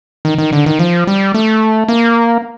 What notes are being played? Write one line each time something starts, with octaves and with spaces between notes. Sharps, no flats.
D#3
D#3
D3
D#3
F3
G3
A3
A#3